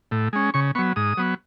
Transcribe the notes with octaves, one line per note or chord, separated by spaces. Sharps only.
A2
G#3 C#4
C#3 C#6
F#3 B3 C#6
G#2 D#6
F#3 B3